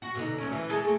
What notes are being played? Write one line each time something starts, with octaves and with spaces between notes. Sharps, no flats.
F#4
B2 D3 D#4
D2 F#3 C#4
E3
G#3 G#4 A4
A3 C4